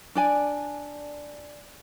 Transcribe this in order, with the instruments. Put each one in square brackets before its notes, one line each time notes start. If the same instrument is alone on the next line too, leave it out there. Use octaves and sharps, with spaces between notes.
[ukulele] D4 D5 G#5